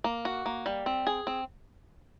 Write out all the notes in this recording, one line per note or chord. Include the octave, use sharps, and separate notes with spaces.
A#3
F#4
A#3
G3
C4
G#4
C4